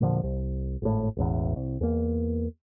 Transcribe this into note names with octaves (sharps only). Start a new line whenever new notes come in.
E1 A#2 D3 F3
C2
G#1 A2
E1 A1 E2
C2
E2 A#3